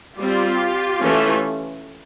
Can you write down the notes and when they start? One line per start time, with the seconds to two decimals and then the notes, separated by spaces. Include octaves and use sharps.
0.17 G3 C4 F4 G4
1.00 E3 A3 C#4